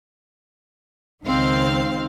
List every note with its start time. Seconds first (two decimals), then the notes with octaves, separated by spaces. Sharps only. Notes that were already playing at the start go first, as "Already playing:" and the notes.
1.25 C#2 D#3 C4 F5